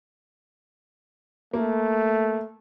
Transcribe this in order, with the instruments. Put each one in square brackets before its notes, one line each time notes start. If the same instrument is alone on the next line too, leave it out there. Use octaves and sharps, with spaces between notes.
[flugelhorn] A3 [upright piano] A#3